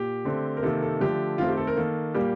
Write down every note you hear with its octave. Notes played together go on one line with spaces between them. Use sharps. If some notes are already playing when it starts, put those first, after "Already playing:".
Already playing: A#2 G4
D3 A3 C4
A#4
C3 D#3 A#3 A4
A4
D3 F3 A3 G4
D#3 A3 C4 F4
G4
A4
A#4
D#3 A#3 A4
A#2 G3 A#3 G4